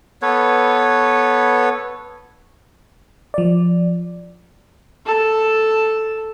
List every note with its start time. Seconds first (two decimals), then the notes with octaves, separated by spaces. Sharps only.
0.22 B3 A4 B4 C#5
3.34 F3 D5
5.05 A4 A5